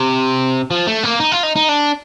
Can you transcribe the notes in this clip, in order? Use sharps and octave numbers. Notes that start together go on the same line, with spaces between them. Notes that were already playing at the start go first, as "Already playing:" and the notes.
Already playing: C3
F3
A3
A#3
D#4
F4
D#4
D#4
D4